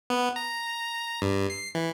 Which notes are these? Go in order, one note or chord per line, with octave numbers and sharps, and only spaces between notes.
B3
A#5
G2
C7
E3